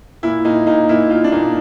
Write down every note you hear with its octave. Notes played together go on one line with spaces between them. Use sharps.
A#2 E4
A#2 D#4
A#2 D#4
A#2 E4
A#2 F4
D4
A#2 D#4